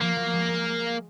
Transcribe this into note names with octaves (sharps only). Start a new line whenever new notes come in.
F3 A#3
F#3
G#3
G#3